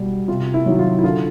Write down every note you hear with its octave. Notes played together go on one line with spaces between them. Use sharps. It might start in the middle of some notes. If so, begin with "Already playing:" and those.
Already playing: B2 G3
C3 F4
E4
D#3 F#3
F4
E4
D3 F4